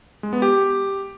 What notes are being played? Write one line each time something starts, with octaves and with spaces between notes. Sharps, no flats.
G#3
B3
G4